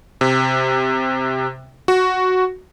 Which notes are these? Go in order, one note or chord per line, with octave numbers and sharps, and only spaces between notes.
C3
F#4